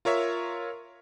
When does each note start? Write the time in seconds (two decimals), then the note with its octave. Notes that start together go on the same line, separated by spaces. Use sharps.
0.05 F4 A#4 C#5 E5